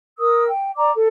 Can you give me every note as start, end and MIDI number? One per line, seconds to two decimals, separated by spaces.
0.19 0.46 70
0.19 0.46 87
0.19 0.46 88
0.47 0.71 79
0.75 0.90 74
0.75 0.90 82
0.75 0.90 86
0.95 1.06 69